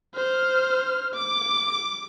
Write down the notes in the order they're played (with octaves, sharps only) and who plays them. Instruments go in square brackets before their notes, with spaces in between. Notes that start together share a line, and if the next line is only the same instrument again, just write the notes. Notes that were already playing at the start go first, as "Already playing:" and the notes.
[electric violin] C5 F6
D6